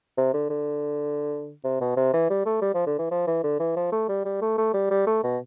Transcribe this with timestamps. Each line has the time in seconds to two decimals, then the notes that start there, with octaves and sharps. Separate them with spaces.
0.18 C3
0.34 D3
0.50 D3
1.64 C3
1.81 B2
1.96 C3
2.13 E3
2.30 G3
2.46 A3
2.62 G3
2.74 F3
2.86 D3
2.99 E3
3.11 F3
3.27 E3
3.44 D3
3.60 E3
3.76 F3
3.92 A3
4.09 G3
4.25 G3
4.41 A3
4.58 A3
4.74 G3
4.90 G3
5.07 A3
5.23 B2